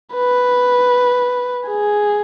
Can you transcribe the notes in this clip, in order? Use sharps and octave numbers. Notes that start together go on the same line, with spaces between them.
B4
G#4